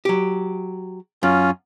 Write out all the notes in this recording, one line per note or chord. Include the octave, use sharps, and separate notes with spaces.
F#3 G4
F#2 C#4 F4